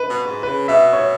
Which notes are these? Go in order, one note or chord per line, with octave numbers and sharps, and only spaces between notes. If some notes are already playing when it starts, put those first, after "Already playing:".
Already playing: B4
B2
G#2
C#3 B4
B2 E5
C#5